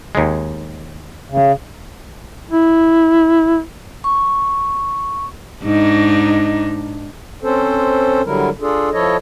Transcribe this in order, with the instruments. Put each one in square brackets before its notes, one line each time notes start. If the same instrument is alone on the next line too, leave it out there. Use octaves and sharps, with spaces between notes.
[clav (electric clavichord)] D#2 G#3
[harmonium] C#3
[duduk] E4
[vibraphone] C#6
[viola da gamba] G#2 D4 D#4
[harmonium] C4 C#4 A4 C5
D3 F#3 G3 E4 A#4
D4 F4 G#4 A4
F3 E4 A4 C#5 D#5